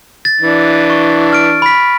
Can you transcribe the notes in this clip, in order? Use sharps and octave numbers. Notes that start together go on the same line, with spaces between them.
A6
E3 D4
C#6
F6 D7
B5 B6